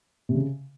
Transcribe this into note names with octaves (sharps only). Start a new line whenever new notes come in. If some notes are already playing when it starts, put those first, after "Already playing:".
C3
C#3